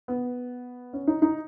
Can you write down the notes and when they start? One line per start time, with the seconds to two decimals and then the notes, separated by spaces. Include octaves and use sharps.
0.08 B3
0.93 C#4
1.07 D#4
1.22 D#4